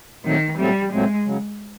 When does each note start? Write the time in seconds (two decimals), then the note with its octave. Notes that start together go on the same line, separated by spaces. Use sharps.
0.24 A#2 D#3 F#3 A3 C4
0.58 A#2 F#3 G3 A3 C4
0.92 A#2 F#3 G#3 A3 C4
1.26 C#3 F#3